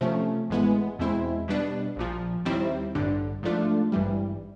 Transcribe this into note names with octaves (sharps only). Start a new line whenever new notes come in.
C3 F3 A3 C#4
A1 A2 E3 G#3 B3
E2 B2 G#3 C4 E4
B2 G3 B3 D4
A#1 A#2 F3
D#2 D#3 G3 C4 E4
A1 G2 D3
G#2 F3 A3 D4 F4
G#1 G2 E3 G3